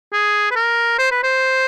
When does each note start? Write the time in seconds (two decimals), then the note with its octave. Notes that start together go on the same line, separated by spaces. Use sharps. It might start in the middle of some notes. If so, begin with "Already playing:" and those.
0.13 G#4
0.51 B4
0.55 A#4
0.99 C5
1.11 B4
1.23 C5